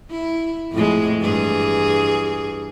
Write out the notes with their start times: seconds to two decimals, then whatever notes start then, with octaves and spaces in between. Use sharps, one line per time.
0.10 E4
0.72 F2 A2 G#3
1.21 G2 E3 G#4